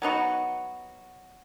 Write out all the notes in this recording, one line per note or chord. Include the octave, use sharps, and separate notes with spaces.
F#3 B3 D#4 F#4